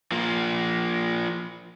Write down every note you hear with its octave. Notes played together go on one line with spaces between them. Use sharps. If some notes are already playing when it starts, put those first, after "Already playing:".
F3 A#3